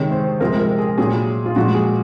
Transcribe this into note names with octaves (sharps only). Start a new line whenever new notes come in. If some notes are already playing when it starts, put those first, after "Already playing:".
Already playing: C3 D#3 G#3 C#5
C5
C3 F3 G#3 A#4
A#4
G#4
A#2 F#3 G#4
F4
A#2 F3 G#3 F#4
G#4